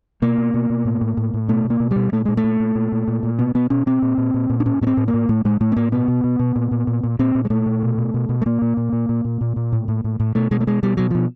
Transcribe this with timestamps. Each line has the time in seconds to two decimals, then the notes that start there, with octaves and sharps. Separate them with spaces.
0.22 B2 A#3
0.38 B2
0.54 B2
0.70 B2
0.85 A2
1.01 A2
1.17 A2
1.34 A2
1.49 B2 A3
1.65 B2
1.70 A#3
1.80 B2
1.91 G3
1.96 B2
2.12 A#2 A3
2.25 A#2 G#3
2.37 A3
2.44 A#2
2.60 A#2
2.75 A#2
2.92 A#2
3.08 A#2
3.23 A#2
3.39 B2 B3
3.55 B2 B3
3.70 B2 C#4
3.86 B2 C4
4.02 A#2
4.18 A#2
4.34 A#2
4.50 A#2
4.60 D4
4.66 A2 C#4
4.81 A2 B3
4.87 C4
4.97 A2
5.08 A#3
5.14 A2
5.29 A2 A3
5.45 A2 G#3
5.60 A2 A3
5.72 B3
5.76 A2 A#3
5.92 B2 B3
6.08 B2
6.24 B2
6.39 B2
6.56 A#2
6.71 A#2
6.87 A#2
7.03 A#2
7.19 A#2 C4
7.35 A#2
7.45 G#3
7.50 A#2 A3
7.66 A#2
7.83 B2
7.98 B2
8.14 B2
8.29 B2
8.42 A3
8.46 A#2 A#3
8.62 A#2
8.77 A#2
8.93 A#2
9.09 A#2
9.25 A#2
9.41 A#2
9.56 A#2
9.72 A2
9.88 A2
10.04 A2
10.20 A2
10.35 B2 A3
10.51 B2 G#3
10.60 A3
10.67 B2 G#3
10.83 B2 G3
10.97 B2 F#3
11.11 B2 F3